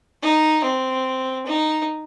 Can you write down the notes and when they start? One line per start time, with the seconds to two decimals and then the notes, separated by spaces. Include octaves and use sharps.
0.22 D#4
0.64 C4
1.46 D#4